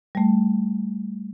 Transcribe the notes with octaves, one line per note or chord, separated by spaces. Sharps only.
G3 A3